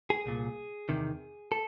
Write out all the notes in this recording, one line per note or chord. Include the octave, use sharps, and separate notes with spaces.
G#4
C2 A#2
E2 C3 D#3
A4